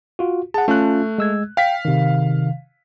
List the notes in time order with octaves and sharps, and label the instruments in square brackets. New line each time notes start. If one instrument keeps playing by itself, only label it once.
[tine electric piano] F4 F#4
[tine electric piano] G#4 F#5 [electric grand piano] A5
[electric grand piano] A3 F#6 [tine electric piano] C#4 F4 A5
[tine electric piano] G#3 E6 G#6
[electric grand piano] F5 B6 [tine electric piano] G5
[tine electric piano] C3 D#3